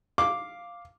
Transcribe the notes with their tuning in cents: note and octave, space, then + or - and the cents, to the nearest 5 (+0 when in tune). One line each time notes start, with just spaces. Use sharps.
F5 +0 D6 +0